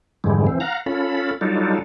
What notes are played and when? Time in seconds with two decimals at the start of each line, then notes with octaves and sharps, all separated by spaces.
0.24 F2 G#2 D3 E3 G3 G#3
0.47 E3 C4
0.60 F5 F#5 A#5
0.86 C#4 F4 A4 B5
1.41 F#3 G3 D4 D#4 F4 A4